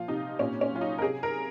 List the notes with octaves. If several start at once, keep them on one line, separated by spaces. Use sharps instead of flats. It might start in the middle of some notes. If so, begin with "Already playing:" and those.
Already playing: A#2 F3 F4
C3 D#4
A#2 C#4
C#4
F#3 F4
D#4
A#4
C3 G#4
A#4